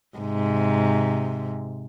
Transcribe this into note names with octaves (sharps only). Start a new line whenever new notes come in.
G#2 C3